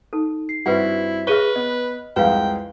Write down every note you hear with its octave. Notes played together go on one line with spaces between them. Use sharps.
D#4 A4
C7
G2 C4 E4 F#4 B4 F#5
G#4 B4 C#5 E5 C#6 F6 D#7 G7
B3 D#5
C2 F2 G#3 B4 F5 G5